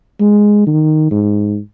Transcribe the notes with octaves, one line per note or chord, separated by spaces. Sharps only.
G#3
D#3
G#2